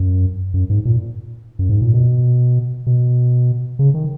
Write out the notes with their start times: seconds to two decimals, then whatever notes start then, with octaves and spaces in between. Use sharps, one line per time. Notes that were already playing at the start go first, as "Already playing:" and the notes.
Already playing: F#2
0.54 F#2
0.70 G#2
0.85 A#2
1.59 F#2
1.69 G#2
1.82 A#2
1.94 B2
2.86 B2
3.79 C#3
3.94 D#3